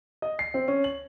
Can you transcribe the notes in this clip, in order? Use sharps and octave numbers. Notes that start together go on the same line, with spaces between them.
D#5
C7
C4
C#4
F#7